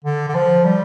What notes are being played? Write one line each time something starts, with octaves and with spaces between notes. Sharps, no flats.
D3
D3
F3
G3